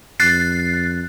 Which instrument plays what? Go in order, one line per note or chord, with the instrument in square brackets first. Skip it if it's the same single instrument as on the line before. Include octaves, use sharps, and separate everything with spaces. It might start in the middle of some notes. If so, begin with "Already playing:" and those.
[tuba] F2 [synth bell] F#6 A6 C7